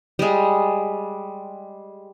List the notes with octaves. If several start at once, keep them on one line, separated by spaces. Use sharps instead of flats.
G3 G#3